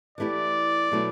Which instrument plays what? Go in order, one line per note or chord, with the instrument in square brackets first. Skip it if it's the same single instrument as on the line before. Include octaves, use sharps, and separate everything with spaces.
[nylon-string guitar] E3 A3 E4 G4 [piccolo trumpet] D5
[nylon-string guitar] B2 F#3 A3 E4